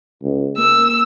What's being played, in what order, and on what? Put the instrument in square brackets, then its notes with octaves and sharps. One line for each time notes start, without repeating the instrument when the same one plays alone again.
[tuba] C#2
[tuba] A#3 [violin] E6